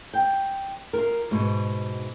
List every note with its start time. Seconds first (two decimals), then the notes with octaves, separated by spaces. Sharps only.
0.14 G5
0.93 F4 A#4
1.31 G#2 B2